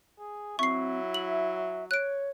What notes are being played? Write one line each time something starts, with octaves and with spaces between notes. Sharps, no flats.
G#4
F#3 C4 E4 C#6 C7
E5 F#7
C#5 F#6 D7